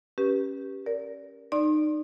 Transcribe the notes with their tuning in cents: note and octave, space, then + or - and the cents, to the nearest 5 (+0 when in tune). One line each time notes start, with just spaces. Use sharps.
C#4 -5 G4 +0 B4 -20
A#4 +0 D5 -25
D#4 -25 D5 +0 C6 +30